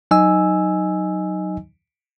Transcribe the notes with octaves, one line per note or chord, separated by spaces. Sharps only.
F#3 D#4 D#5 G#5 E6